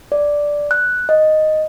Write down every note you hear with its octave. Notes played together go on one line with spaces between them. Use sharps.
D5
F#6
D#5